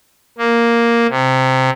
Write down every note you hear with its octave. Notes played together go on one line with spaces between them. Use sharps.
A#3
C3